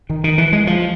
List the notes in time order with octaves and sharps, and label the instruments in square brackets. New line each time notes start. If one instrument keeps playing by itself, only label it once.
[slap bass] D#3
D#3
E3
G#3
F3